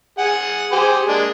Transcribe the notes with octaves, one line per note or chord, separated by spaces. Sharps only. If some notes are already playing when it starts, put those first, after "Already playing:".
G#4 F#5
G4 G#4 C5
G#3 A#3 D4